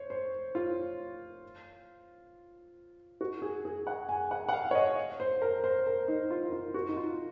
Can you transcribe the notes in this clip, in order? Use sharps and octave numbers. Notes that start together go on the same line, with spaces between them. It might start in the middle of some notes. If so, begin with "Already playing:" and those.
Already playing: C5 C#5
C5
F4
F#4
G#4
G#4
F#5
G#5
F#5
F#5
F5
C#5
D#5
C5
A#4
C5
A#4
D#4
F4
F4
F#4
D#4
F4